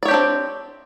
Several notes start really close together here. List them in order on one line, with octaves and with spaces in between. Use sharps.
D5 C#5 G4 D4 C4